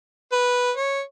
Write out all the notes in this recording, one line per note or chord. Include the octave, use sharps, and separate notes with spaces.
B4
C#5